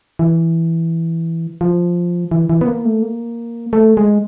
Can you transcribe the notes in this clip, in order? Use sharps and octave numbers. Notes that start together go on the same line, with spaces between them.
E3
F3
E3
E3
B3
A#3
A3
A#3
A3
G#3